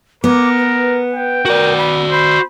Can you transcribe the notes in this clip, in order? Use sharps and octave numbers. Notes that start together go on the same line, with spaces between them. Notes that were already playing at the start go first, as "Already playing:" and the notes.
B3 A#4 D6
B4
G5
F#4 A#4 D5
B5
C5 B5